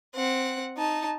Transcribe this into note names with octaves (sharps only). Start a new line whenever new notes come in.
C4 F#5
D#4 A5